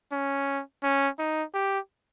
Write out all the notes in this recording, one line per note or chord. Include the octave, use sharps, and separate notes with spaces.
C#4
C#4
D#4
G4